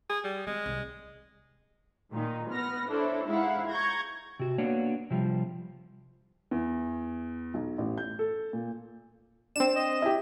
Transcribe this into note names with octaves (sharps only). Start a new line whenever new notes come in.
G#4
G3
G#3 C4
C2
A#2 D#3 D#4
B3 B4 F6 A#6
D4 E4 A4 C5 C#5
G#2 E4 F5 F#5
A#5 C#6 G6 G#6 A#6
C3 F#4
A#3 B3 D4 F#4 C#5
C3 F3 G3
E2
B1
A1
G6
A4
A#2
C4 D4 E7
D#5
E4 G4